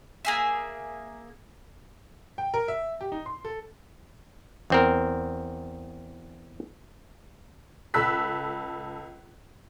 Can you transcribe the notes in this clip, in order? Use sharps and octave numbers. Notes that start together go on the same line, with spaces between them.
A#3 G#4 E5
G5
A#4
E5
G4
D#4
C6
A4
E2 C4 A#4
C#2 A4 B5 E6 F#6 B6